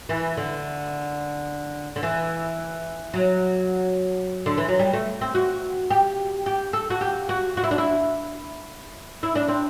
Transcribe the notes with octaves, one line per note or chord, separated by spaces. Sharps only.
E3
D3
D3
E3
F#3
D3
E3
F#3
G3
A3
C4
F#4
G4
G4
A4
F#4
G4
F#4
F#4
E4
D4
E4
E4
D4
C4